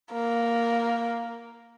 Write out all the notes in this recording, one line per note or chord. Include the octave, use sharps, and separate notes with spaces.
A#3